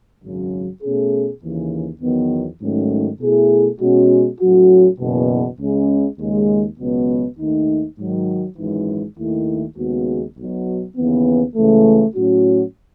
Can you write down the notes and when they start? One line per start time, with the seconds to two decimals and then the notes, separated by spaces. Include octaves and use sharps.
0.22 G#1 F#2 C#3 F#3
0.83 B2 A3 C#4 G#4
1.42 D#2 C#3 E3
2.01 E2 D#3 F#3 B3
2.61 G#2 D#3 F#3 A3 C#4
3.20 B2 A3 E4 G#4
3.80 B2 G#3 C#4 F#4
4.41 A2 F#3 C#4 F#4
5.00 F#1 E2 B2
5.59 C#2 C#3 G#3 C#4
6.19 D#2 C#3 G#3
6.79 C#2 B2 F#3 B3
7.39 D#2 D#3 A3 D#4
7.98 G#2 D#3 F#3
8.57 G#1 F#2 E3 G#3 D#4
9.17 D#2 D#3 A3 E4
9.77 D#2 C#3 G#3 B3 F#4
10.37 B1 B2 F#3
10.97 D#2 C#3 E3 B3
11.56 C#2 C#3 E3 A3
12.16 A2 F#3 C#4 F#4